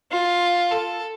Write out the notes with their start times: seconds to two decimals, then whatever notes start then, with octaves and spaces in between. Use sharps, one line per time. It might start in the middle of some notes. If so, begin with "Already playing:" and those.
0.12 F4
0.71 A4